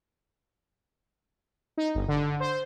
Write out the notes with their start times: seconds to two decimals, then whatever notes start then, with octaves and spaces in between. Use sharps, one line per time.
1.77 D#4
1.95 G1
2.08 D3
2.40 C5